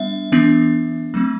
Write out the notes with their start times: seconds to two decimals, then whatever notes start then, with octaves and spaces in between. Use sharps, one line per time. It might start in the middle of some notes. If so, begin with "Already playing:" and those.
Already playing: G3 B3 D4 E5
0.32 E3 B3 D4
1.14 F#3 A3 C4